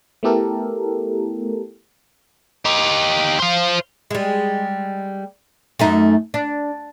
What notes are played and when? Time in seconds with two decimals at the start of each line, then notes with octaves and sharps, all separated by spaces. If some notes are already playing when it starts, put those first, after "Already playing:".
0.23 A3 B3 E4 G4 A4 A#4
2.65 D#4 G4
3.40 C5 F5
4.11 G3 G#3
5.79 F#2 A3 D#4
6.34 D4